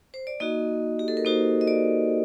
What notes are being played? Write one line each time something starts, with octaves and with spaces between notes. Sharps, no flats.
C5
D5
A#3 D#4 F#4 D#5
G4
A4
A#4
A#3 D#4 F#4 C5
D#5
D5